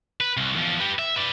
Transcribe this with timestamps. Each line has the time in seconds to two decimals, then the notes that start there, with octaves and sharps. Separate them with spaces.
0.21 B4
0.37 C2
0.55 E2 F3
0.80 G4 B4
0.99 E5
1.16 B4 D5